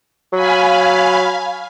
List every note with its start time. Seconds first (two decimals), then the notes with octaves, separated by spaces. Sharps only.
0.33 F#3 F5 G#5 B5